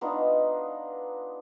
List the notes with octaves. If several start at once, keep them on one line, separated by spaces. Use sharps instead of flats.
B3 D4 D#4 F4